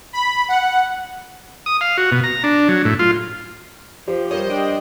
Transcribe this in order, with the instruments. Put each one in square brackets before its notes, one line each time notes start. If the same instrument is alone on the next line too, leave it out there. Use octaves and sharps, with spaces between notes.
[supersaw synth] B5
F#5
[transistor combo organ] D#6
F5
F#4
B2
A#5
D4
F#3
A2
F4
[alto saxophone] F3 [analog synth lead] G4 [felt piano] C5
[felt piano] G3 A#4 C#5 [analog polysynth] C5 D#5
[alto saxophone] D4 [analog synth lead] G5